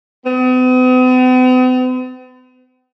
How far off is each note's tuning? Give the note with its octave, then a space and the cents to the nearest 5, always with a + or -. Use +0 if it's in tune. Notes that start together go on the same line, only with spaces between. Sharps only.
B3 +45